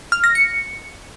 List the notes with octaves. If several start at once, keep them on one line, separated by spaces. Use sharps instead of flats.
F6
A#6
C#7